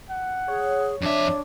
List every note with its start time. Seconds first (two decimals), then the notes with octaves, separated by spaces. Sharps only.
0.10 F#5
0.48 G#4 C#5
1.02 F2 D4 E5